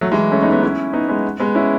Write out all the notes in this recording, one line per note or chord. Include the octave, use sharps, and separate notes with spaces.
F#3 A3
E3 G#3
A3 C#4
B3 D#4
B3 D#4
C#4 E4
B3 D#4
G#3 B3
G#3 B3
C#4 E4